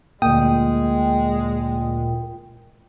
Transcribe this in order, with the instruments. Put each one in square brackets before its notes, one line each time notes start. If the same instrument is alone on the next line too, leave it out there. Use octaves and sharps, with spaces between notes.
[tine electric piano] D2 D#6 [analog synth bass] A#2 [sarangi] G#3 [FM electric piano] G5